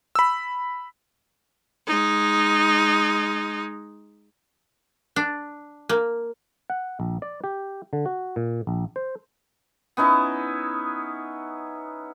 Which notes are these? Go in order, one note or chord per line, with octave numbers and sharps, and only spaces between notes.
B5 E6
G#3 D#4
D4
A#3
F#5
A#1
D5
G4
D3
F#4
A#2
A#1
C5
B3 C#4 D#4 E4